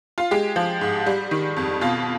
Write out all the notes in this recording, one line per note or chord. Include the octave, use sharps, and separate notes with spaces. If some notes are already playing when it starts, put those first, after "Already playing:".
F4
G#3 G4
F3
G#2
G3
D#3
F2
B2 F4